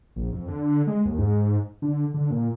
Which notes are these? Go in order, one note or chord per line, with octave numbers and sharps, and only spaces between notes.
A#1
F2
D3
G#3
D#2
G#2
D3
D3
A#2